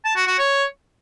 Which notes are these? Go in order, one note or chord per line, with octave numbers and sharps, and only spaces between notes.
A5
F#4
F#4
C#5